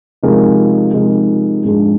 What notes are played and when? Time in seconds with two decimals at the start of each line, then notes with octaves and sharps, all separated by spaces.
0.23 C3 F3 G#3 D#4 A#4
0.93 C3 F3 G#3 D#4 A#4
1.65 G#2 F3 G#3 D4 G#4